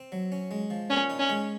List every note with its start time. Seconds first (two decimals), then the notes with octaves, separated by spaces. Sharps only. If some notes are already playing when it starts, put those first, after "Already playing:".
Already playing: C4
0.12 F#3
0.32 C#4
0.51 G#3
0.70 F3
0.90 A#2 C#4
1.10 D#4
1.19 C#4
1.29 G#3